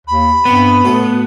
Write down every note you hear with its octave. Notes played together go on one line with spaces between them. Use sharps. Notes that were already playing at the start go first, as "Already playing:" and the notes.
D#2 B5
G2 B3 C4 G5
A2 F#4 A4 B4